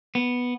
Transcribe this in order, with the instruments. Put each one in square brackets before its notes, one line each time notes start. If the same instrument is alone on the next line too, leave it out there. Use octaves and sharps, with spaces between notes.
[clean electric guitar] B3